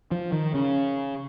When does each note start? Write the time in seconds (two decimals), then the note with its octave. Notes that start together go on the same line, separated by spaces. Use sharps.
0.12 F3
0.32 D#3
0.54 C#3